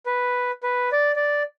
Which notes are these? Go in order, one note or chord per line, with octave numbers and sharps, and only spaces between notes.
B4
B4
D5
D5